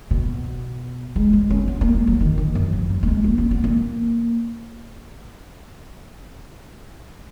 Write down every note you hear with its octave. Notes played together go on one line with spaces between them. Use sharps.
B2
G#3
G#3
C#4
B3
A#3
G#3
F#3
D#3
D#3
F#2
F3
F#3
A#3
G#3
A#3
C#4
B3
A#3